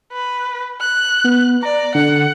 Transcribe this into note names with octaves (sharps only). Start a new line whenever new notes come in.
B4
F#6
B3
D5 A#5
D3 F#5